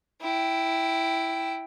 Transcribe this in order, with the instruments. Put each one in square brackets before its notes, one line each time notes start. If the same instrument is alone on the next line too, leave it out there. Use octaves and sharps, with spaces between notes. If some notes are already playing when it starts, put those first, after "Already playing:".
[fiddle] E4 G5